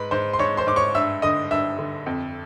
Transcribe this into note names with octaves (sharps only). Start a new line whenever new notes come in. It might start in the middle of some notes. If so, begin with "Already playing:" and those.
Already playing: G#2 B4 B5
G#2 C5 C6
C6
G#2 C#5 C#6
C5 C6
G#2 D6
C#5 C#6
G2 E5 E6
D3 D#5 D#6
G2 E5 E6
D3
F2